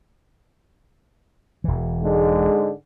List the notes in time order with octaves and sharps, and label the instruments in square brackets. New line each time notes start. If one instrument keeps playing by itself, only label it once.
[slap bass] E1 E3
[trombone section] G#2 D3 G#3